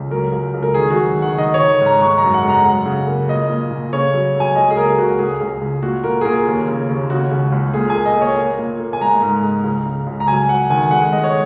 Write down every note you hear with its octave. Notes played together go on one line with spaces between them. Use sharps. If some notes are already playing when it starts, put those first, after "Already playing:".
Already playing: C#2
F#3 A#4
C#2
C#2
A#4
D#3 G#4
F#4
F#3
D#3
F#5
D#3 D#5
C#5
D#3
G#2
A#5
G#3 C#6
A#5
F#2
F#5
G#3 A#5
F#3 F#5
C#3
A#3
A#2 D#5
A#2
A#2
C#3 C#5
F#3
F#3
G#5
C#2 D#5
G#4
A#3 A#4
C#2 F#4
C#2 G#4
C#2
C#2
A#2 F#4
A#2 A#4
G#4
A#2 A#4
D#2
C#3
D#2
C#3 F#4
C#2
C#2
A#2 G#4
A#3 G#5
D#5
A#3
C#5
A#3
A#2
A#3
G#5
G#3 A#5
G#2
G#3
C#2
C#3
C#2
A#5
F#3 G#5
F#3 F#5
D#3 G#5
G#3 F#5
G#3 D#5
C#5